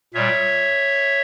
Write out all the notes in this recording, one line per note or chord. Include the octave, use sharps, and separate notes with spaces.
A#2 G3 C#5 E5